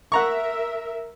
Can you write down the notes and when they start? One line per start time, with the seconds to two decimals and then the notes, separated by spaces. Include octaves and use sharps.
0.12 A#4 E5 F#5 A#5 C#6